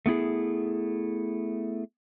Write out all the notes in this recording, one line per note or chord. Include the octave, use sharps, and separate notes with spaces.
A3 B3 E4 G#4